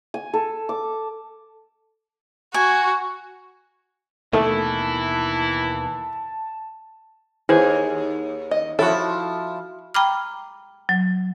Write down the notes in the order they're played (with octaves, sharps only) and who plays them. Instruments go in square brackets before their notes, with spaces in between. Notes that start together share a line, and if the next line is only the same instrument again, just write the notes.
[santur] G#5
A4
D6
[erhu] F#4 [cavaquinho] G#5
[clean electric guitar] D#2 B2 D#3 [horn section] E3 E4 [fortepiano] A3 A4 [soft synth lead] A5
[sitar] D#2 [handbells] E4 B4 C5 [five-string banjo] G#4
[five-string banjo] D#5
[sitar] F3 E4 [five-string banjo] F#4 A4 [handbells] C#5
[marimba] G5 A#5 B5 D6 F6
F#3